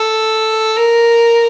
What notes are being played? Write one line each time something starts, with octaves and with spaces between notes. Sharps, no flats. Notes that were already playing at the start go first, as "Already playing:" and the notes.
Already playing: A4
A#4